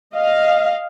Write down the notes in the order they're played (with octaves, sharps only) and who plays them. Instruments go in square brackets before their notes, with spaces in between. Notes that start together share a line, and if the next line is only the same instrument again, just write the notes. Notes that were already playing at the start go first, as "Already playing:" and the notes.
[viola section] D#5 F5